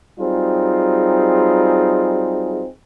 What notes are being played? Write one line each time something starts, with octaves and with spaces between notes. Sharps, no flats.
F#3 G3 C4 D#4 F4 G#4